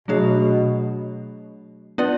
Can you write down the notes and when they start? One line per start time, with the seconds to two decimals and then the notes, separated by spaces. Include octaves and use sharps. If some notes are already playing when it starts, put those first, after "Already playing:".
0.08 B2 F#3 A3 D4 G#4 C#5
1.98 B3 D4 F4 B4 D5